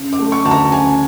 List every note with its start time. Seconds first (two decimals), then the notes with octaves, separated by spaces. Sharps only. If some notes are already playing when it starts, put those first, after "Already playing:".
Already playing: C#3
0.13 D6
0.19 A3
0.32 C#6
0.45 D2 A5
0.51 A#5
0.72 C#3 G#5